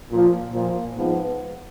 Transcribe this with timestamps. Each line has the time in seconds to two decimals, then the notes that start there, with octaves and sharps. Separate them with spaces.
0.11 A#2 F3
0.54 A#2 F3
0.97 G#2 F3 B3